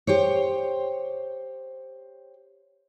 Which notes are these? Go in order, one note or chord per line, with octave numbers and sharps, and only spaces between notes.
G4 C5 C#5